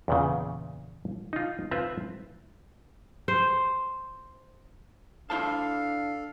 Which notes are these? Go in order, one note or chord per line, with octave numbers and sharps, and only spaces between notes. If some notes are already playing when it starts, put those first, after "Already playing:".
E2 A#2 C#3
D#4 F4
C4 F4 B4 E5
C5
D4 E4 A4 C5 F5 A5